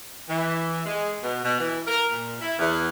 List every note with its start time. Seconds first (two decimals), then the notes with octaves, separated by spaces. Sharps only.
0.30 E3
0.86 G#3
1.23 B2
1.44 B2
1.60 E3
1.87 A#4
2.12 A#2
2.40 E4
2.59 E2